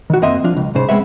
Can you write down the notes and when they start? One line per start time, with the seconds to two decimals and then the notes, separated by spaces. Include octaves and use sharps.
0.10 D#3 F#4
0.22 F#2 A#3 C4 D#5 E5 C6
0.44 F3 D4 F4
0.57 C#2
0.75 C2 G#2 C#3 C5
0.89 G#3 B3 C4 B4 C#5 E5